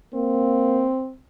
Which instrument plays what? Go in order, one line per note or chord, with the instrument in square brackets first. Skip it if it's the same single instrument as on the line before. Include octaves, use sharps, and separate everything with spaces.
[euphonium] A#3 [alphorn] C4